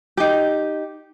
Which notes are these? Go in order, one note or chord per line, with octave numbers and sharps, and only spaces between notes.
D#4 G4